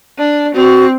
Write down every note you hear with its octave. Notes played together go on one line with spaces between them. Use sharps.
D4
C4 F#4